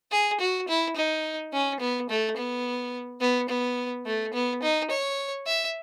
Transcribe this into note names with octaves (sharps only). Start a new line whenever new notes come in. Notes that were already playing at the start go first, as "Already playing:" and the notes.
G#4
F#4
E4
D#4
C#4
B3
A3
B3
B3
B3
A3
B3
D#4
C#5
E5